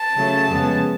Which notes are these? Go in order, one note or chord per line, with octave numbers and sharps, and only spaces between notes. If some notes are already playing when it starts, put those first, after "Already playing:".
Already playing: A5
C#3 F#3 A3
F2 C#3 G#3 B3